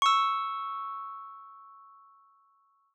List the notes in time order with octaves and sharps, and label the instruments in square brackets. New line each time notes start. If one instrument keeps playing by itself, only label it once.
[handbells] C#6 E6